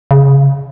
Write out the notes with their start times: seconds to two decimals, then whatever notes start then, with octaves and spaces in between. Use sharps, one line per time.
0.11 C#3